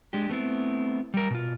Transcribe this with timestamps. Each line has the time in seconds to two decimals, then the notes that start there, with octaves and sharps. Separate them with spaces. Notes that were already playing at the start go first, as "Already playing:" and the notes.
0.13 G#3 D4 G4
0.29 A3 B3 C4 E4
1.14 G3 A#4
1.30 B2 F4